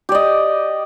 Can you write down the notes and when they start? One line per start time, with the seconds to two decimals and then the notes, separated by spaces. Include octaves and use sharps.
0.09 G4
0.12 D5
0.15 D#5